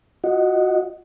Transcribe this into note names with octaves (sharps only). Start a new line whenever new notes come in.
F4 F#4 D#5 F#5